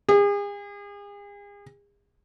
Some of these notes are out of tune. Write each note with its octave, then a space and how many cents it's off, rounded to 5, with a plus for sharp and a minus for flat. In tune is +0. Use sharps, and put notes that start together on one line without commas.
G#4 -40